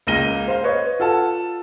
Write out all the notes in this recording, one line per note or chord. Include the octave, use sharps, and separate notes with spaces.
C#2 A#3 A#6 D#7 G7
C5 F5
B4 C#5 D#5
F4 A4 F#5 A5